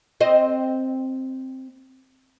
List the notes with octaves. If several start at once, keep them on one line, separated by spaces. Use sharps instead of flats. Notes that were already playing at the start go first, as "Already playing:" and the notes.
C4 D#5